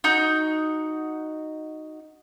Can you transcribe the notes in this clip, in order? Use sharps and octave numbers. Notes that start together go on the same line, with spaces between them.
D#4 F#4 G6